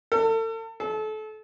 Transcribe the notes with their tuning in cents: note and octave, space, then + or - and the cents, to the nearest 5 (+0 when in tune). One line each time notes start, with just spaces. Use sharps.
A4 +40
A4 -30